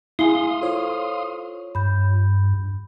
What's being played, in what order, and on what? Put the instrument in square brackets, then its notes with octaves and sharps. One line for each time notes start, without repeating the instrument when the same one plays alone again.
[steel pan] E4 [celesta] G#4 G#5 G7 [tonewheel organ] F5 C6 D#6
[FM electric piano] F4 C#5 [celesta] A4 C5
[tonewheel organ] G2 [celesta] B5 G6